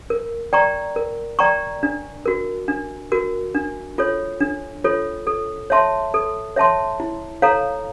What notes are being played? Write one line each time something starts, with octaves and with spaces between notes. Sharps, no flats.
A#4
D5 G5 A#5 C#6
A#4
D5 G5 A#5 C#6
D4
F#4 A#4
D4
F#4 A#4
D4
F4 A4 C#5
D4
F4 A4 C#5
A4
C#5 E5 A5 C6
A4
C#5 E5 A5 C6
E4
A4 C#5 F5 A#5